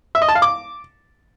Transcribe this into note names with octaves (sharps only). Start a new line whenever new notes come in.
E5
D#5
A5
F5
D6